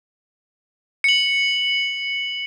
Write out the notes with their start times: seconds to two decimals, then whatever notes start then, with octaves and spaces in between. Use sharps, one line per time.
1.04 C#7 F#7